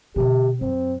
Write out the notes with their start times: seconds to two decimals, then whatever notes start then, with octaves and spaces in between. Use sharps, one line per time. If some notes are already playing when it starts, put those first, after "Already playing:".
0.16 B2 D3 G4
0.61 F#2 C4